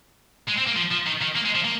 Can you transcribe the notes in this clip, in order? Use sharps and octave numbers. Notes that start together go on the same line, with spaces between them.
G#3
C4
A#3
F3
F3
D#3
D#3
A#3
G#3
F3
A#3